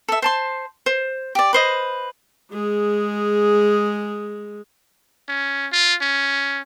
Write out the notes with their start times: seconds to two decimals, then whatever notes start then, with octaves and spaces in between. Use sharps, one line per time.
0.08 A4 E5
0.22 C5 A5 C6
0.86 C5
1.35 G4 D5
1.53 B4 C5 D#5
2.52 G#3 G#4
5.29 C#4
5.72 F4
6.01 C#4